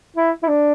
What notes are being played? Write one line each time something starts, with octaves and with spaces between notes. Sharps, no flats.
E4
E4
D4